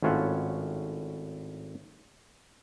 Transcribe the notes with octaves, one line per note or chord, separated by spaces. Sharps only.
G#1 A2 C#4 F4 E5 F#5